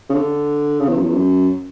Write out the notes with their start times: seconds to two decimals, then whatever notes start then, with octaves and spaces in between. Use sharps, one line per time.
0.10 C#3
0.14 D3
0.80 C#3
0.88 E2
0.97 F#2
1.05 E2
1.14 F#2